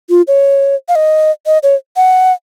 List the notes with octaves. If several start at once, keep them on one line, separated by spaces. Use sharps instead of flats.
F4
C#5
F5
D#5
D#5
C#5
F#5